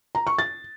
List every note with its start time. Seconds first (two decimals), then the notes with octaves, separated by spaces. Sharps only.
0.15 A#5
0.27 C#6
0.39 A6